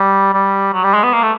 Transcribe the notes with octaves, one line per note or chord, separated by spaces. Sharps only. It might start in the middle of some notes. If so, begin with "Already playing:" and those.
Already playing: G3
G3
F#3
G3
G#3
B3
A#3
A3